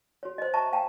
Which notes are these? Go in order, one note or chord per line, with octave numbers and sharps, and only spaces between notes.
F#4 C#5
C5 D#5
E5 A5 A#5 C#6
F5 G5 A5 A#5